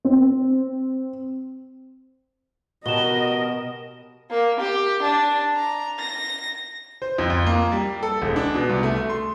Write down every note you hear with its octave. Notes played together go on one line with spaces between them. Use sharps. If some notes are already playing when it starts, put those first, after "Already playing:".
C4
B2 F#3 G3 A#4 D#5 E7 G7
A#3
G4
D4
A#5
A#6
C5
F2
F2
A#3
G3
A4
E1
D4
B2
C2
A3
C6